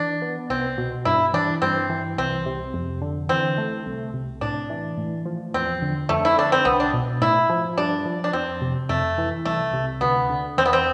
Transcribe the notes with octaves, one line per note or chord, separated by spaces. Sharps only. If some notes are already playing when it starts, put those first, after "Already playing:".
Already playing: E3 D4
B3
C2 C4
B2
G2 E4
E3 D4
G2 C4
E3
C2 C4
C3
F2
D3
E3 C4
A3
C2
C3
A2 D4
E3
A2
F3
E2 C4
D3
F2 A3
E4
D3 D4
C4
C2 B3
D4
B2
A2 E4
F3
G2 D4
F3
D4
F2 C4
C3
F2 A3
E3
C2 A3
C3
D2 B3
D3
E2 C4
B3
C4